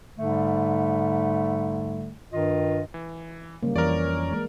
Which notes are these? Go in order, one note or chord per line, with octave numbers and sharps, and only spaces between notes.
G#2 D3 G3 A3
G2 D#3 F4 D#5
E3
C#3 G3 A#3
F2 E3 C#4 A#4 D5
G#3 A#3